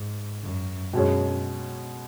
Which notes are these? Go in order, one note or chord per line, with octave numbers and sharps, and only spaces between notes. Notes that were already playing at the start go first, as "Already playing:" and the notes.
Already playing: G#2
F#2
F#2 B2 G#3 C#4